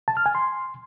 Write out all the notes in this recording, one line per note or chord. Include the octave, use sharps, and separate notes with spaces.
A5
F6
G#5
C6